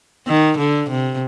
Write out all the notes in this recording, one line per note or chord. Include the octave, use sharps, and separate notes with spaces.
D#3
D3
C3